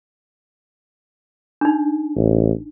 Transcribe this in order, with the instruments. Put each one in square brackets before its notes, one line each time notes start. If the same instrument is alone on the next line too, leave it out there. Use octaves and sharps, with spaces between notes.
[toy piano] D4 D#4
[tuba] A1